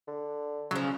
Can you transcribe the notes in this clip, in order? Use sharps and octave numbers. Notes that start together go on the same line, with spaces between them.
D3
C#3 F3 F#3 C#4